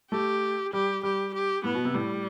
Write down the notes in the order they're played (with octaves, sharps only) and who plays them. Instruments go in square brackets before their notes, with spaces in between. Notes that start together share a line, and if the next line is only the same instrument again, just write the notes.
[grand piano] A3 [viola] G4
[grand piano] G3 [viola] G4
[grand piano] G3 [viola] G4
[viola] G4
[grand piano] A2 [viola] B3
[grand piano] B2
C3
[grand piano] A2 [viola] G3